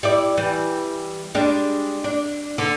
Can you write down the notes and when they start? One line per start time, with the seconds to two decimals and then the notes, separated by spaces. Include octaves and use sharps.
0.03 G3 E4 D5
0.37 E3 G3
1.35 G3 G#3 D4
2.04 D4
2.58 D3